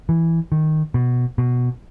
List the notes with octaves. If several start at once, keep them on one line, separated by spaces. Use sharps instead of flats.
E3
D#3
B2
B2